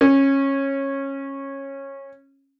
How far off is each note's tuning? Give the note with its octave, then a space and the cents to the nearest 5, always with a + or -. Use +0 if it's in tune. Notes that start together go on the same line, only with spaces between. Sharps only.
C#4 -20